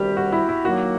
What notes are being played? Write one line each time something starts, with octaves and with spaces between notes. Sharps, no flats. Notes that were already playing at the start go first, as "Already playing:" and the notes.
Already playing: D2 C3 D#3 G3 G4
F#4
E4
E4
D#3 F#3 A#3 F#4